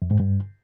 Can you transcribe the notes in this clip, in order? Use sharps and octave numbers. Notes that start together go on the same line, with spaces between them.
F2
G#2
G2